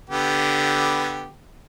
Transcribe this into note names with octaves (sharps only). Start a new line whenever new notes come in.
D3 B3 G4